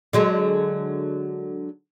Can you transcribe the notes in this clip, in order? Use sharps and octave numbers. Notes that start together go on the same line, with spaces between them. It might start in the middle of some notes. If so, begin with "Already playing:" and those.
D3 F#3 G#3